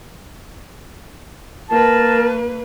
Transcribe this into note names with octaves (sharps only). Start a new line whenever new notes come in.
A#3 A#4 B4 A5